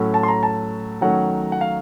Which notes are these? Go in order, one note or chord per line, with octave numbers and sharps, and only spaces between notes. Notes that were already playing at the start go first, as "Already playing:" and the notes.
Already playing: A2 F#3 A3 C#4
A5
C6
A#5
A5
D#3 F#3 A3 C#4 F#5
F#5
F5